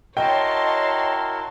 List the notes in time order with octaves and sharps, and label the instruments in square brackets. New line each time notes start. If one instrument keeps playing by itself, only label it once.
[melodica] E4 F#4 A#4 [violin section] C#5 A5 C6 [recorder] D#5 [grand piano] G5